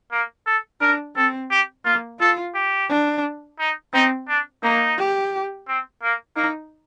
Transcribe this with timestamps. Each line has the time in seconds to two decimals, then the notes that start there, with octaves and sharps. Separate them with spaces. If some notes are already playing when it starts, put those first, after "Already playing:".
0.11 A#3
0.46 A4
0.81 D4 A#4
1.16 C4 A4
1.50 G4
1.85 A#3 F4
2.19 F4 A4
2.54 G4
2.89 D4
3.59 D#4
3.93 C4 D#4
4.28 D4
4.63 A#3 D#4
4.98 G4
5.68 C4
6.02 A#3
6.36 A#3 D#4